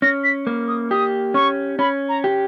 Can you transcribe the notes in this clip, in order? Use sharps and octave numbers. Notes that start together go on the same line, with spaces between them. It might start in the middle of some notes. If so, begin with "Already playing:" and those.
C#4 A#6
B6
A#3
D#6
G4 D#6
C#4 C#6
C#4 B5
A#5
G4